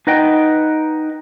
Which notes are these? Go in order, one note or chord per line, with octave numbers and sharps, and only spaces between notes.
D#4 B4 D#5 F#5 G5